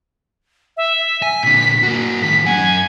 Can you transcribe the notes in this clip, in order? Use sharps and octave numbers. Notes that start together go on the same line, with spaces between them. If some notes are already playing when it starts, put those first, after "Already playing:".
E5
G#5 B6
A#2 D3
A#3 F#4
A2 D#3 B6
F#2 F#5 G#5